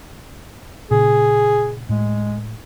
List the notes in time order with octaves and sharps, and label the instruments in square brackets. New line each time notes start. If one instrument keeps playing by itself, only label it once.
[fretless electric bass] A#2 C#3 [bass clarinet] G#4
[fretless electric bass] A2 [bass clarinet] G#3